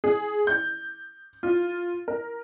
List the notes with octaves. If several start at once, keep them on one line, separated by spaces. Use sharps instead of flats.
G#4
G6
F4
A#4